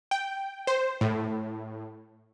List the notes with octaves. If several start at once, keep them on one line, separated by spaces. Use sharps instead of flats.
G5
C5
A2